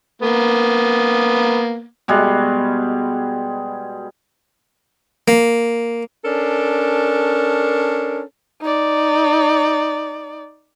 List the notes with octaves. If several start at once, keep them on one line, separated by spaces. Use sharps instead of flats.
A#3 B3
B2 G3 G#3
A#3
C#4 D4 A4 A#4
D#4 D5